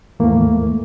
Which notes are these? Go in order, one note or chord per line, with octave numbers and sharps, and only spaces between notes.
D#2 G#2 E3 A3 A#3